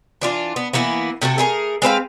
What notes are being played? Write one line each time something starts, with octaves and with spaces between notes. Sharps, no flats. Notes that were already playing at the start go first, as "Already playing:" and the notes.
E3 D4 F4
B3
E3 A#3 B3 E4
C3 A3 F#4 A4
A3 G#4 A#4
G#3 C4 B4 F5